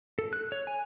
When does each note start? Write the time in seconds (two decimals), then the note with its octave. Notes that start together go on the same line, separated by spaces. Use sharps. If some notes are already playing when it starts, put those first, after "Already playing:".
0.19 A4
0.33 F#6
0.52 C#5
0.67 G#5